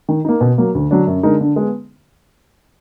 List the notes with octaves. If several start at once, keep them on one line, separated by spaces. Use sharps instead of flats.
D#3
A#3 D#4
B2
F#3 A#3
D2
D3 F#3 D4
F#2
D3 G#3 D#4 A#4
D3
G#3 B3